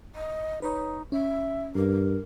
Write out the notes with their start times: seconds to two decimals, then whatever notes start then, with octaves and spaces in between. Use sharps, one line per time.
0.15 D#5
0.62 D#4 B4 C#5
1.12 C#4 E5
1.75 G2 A#4